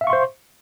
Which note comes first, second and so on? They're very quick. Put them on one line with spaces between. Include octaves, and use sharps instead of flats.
E5 F5 C#6 C6 C5